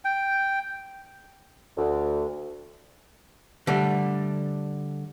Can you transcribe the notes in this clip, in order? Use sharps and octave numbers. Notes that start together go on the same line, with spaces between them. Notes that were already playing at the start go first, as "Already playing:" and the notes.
G5
D2
D3 G3 A3